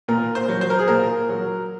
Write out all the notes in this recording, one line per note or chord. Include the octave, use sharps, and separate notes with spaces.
A#2 A#4
C5
F#3
C5
A#4
G#4
A#2 A#4
F#3